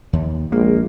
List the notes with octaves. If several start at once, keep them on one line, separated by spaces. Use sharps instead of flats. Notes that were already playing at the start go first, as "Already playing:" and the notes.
D#2
A#1 G#3 A#3